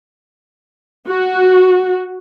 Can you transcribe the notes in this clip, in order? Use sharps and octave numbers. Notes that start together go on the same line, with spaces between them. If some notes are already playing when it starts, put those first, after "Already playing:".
F#4